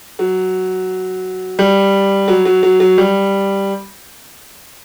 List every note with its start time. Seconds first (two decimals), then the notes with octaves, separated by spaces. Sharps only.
0.19 F#3
1.59 G3
2.28 F#3
2.45 F#3
2.63 F#3
2.80 F#3
2.98 G3